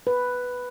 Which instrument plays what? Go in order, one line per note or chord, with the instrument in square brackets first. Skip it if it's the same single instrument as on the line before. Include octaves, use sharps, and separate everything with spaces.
[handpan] B4